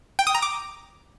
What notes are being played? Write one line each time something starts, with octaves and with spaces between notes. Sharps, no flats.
G5
D#6
A#5
D6